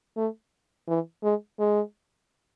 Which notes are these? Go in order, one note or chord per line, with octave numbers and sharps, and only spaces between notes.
A3
E3
G#3
G#3